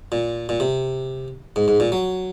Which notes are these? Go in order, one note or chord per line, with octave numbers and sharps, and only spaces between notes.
A#2
A#2
C3
G#2
G#2
A#2
F#3